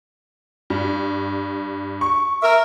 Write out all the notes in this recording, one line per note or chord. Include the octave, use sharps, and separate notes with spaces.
G2
C#6
A#4 E5